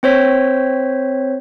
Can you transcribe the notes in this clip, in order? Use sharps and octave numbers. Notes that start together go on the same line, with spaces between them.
C4 C5 C#5 B6